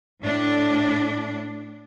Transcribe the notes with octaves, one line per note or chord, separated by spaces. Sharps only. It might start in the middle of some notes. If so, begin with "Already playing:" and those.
A2 D4